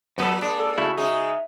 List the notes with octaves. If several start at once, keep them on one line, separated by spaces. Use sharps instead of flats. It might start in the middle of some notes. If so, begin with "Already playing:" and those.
F#2 F3 A#3 B3 A4 B4
G#3 A#3 D4 D5
A4
C#3 A3 E4 F#4
C#3 G#3 D#4 G#4 E5